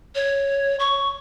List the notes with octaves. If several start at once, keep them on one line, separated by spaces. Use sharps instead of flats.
C#5
C#6